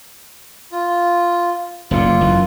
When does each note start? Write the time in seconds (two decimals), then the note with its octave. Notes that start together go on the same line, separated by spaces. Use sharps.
0.72 F4
1.91 F#1 A#2 D3 F4
2.21 F#1 F#2 E3